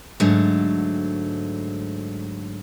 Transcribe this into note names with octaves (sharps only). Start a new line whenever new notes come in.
G#2 D3 F#3 A3